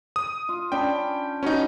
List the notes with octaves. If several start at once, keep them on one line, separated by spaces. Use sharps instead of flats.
D#6
F4
C#4 D4 G5 B5
C#4 D#4 F#4 B4